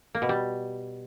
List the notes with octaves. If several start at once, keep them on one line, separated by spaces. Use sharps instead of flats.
A#3
B2
G3